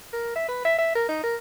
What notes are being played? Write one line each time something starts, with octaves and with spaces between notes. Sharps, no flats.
A#4
E5
B4
E5
E5
A#4
D#4
A#4